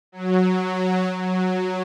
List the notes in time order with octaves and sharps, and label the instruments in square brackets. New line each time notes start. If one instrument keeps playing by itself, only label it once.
[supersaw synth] F#3
F#3